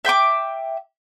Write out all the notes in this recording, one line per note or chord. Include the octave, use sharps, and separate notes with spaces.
E5 G5 B5 D6